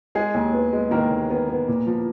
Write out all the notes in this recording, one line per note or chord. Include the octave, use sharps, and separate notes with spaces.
G#3 G#4
D#2
B3
G#3
D#3 A#3 A#4
D#2
B3
B3
A#2
F3